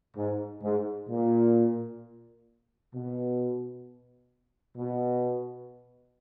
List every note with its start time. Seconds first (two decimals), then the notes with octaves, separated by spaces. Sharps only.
0.16 G#2
0.63 G#2
1.10 A#2
2.94 B2
4.77 B2